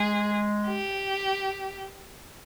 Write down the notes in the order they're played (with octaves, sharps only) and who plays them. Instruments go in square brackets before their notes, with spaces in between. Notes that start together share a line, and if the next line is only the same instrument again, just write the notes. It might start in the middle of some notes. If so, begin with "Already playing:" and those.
Already playing: [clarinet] G#3 [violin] G#4
[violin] G4